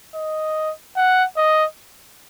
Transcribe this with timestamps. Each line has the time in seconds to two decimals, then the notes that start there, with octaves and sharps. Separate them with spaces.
0.15 D#5
0.96 F#5
1.37 D#5